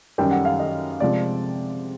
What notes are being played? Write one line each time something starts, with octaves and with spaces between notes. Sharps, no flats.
F#2 D#3 G3 G5
F#5
F5
D#5
C3 F3 G#3 D5